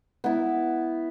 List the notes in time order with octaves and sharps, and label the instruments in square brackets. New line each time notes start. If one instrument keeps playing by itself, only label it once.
[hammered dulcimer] B3 E4